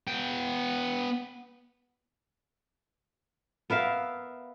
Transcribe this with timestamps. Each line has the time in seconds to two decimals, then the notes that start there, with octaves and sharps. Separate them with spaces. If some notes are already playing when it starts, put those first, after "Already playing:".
0.07 B3 G5
3.70 B3 A#4 E5 F5